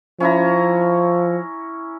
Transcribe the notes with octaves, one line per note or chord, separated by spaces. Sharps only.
F3 C#4 E4 A#5